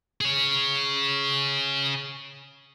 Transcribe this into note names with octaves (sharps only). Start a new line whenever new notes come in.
G#4 C#5